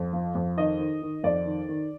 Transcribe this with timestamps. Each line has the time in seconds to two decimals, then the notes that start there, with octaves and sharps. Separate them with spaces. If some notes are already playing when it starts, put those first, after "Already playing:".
Already playing: F2
0.13 F3
0.35 F2
0.57 D#3 D#5
0.79 D#3
1.02 D#3
1.24 F2 D5
1.46 D#3
1.69 D#3